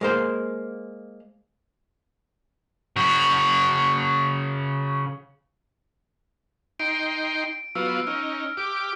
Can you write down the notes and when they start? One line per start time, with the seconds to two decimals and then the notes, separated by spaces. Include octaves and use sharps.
0.01 G#3 A#3 C5
2.96 C#3 F#4
6.80 D#4 G5 C6 D7
7.75 F#3 B3 F4 E6
8.07 C#4 D#4 F6
8.57 G4 D6